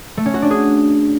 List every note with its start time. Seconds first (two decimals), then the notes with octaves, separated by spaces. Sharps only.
0.17 A3
0.26 C#4
0.34 F#4
0.42 D4
0.51 G#4